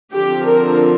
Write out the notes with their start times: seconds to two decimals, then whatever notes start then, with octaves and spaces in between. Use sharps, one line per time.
0.13 D3 F3 C4 G4
0.44 A#4